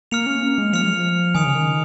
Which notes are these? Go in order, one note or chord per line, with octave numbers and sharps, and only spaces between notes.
A#3 F6 C#7 F7
C#4
A#3
G#3
F3 F6 C#7 F7
G#3
F3
D#3 G#5 D#6 C#7 F7
C#3
D#3